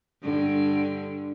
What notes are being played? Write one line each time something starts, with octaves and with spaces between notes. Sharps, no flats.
G2 D3